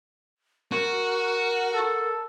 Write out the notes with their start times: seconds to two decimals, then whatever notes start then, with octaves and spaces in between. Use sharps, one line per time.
0.72 F#4 A#4
1.74 A4